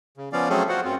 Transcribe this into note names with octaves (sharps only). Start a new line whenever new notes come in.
C#3
F3 B3 C#4 D5 F5
F#3 A3 C4 C#4 G#4 A4
F4 F#4 C5 F#5
F#2 C4 F4